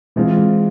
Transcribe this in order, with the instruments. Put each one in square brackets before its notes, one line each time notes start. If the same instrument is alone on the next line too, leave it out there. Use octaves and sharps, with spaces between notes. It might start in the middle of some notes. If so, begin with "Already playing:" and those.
[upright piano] E3 G#3 C4 F4